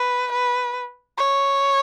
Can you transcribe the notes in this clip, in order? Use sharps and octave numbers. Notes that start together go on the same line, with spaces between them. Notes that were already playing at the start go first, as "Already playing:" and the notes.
Already playing: B4
B4
C#5